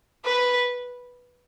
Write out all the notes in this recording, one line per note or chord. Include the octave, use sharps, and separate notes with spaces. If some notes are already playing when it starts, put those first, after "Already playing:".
B4